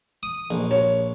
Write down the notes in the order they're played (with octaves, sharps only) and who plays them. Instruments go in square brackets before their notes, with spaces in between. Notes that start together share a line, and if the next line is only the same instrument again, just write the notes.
[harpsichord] D#6
A#1
[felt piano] C#5